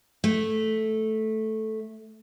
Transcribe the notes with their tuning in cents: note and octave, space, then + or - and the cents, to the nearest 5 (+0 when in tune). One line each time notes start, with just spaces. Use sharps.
A3 -5